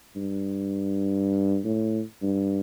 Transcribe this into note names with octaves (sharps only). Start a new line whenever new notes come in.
G2
A2
G2